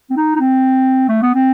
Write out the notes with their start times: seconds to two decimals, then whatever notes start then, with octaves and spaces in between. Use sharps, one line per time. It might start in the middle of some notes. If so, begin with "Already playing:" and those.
0.10 C4
0.17 D#4
0.36 D#4
0.40 C4
1.08 A3
1.22 B3
1.35 C4